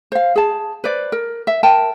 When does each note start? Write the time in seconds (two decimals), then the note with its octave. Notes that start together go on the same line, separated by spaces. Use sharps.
0.12 C5 F5
0.36 G#4 A5
0.84 B4 C5 D5
1.12 A#4
1.47 E5
1.63 A#4 G5 A5